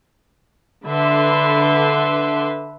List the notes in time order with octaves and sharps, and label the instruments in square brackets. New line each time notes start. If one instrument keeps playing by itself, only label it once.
[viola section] D3 B4 E5 C6